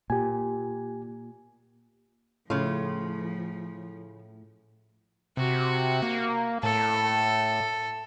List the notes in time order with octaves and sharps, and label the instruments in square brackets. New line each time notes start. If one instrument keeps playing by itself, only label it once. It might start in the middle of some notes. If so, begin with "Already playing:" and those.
[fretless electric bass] A#2 [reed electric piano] G4 G#5
[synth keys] A2 [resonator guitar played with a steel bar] C#3 F4 [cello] F3
[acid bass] C3 [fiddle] F#4
[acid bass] A#3
[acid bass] A2 [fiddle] A4